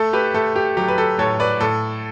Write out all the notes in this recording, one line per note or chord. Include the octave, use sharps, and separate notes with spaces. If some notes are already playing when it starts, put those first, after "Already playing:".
Already playing: A3 A4
G4 B4
A3 A4
G4
F#3 G4
B4
A4
A2 A4 C#5
B4 D5
A2 A4